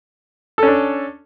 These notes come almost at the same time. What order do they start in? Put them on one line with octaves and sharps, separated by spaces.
A4 C#4 D4